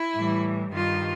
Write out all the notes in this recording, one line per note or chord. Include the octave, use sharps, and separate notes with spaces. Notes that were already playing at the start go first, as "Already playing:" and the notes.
Already playing: E4
A2 E3 G3
G2 D#3 G3 F4